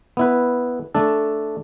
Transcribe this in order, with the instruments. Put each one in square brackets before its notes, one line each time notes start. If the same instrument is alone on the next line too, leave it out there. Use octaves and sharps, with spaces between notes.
[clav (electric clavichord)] B3 E4 B4
A3 D4 A4